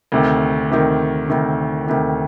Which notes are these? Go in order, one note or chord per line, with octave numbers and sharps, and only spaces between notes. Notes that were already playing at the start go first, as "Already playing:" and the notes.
D2 C3 D#3
D2 C3 D#3
D2 C3 D#3
D2 C3 D#3